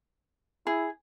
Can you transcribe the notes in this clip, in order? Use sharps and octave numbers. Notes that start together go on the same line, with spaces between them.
E4 G#4